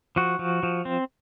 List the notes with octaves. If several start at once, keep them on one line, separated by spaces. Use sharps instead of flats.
F3 F#4
F3
F3
C4